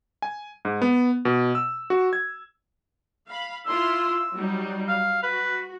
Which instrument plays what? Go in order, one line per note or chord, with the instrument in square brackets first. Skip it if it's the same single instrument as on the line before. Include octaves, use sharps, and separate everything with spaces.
[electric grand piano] G#5
G#2
B3
B2
E6
F#4
G#6
[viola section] F5 B5
[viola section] E4 F4 C6 [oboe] E6
[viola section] F#3 G3 D#4
[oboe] F5
[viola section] F#4 [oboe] B4